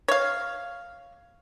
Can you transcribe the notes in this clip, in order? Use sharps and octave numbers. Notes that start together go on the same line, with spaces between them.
C#5 F5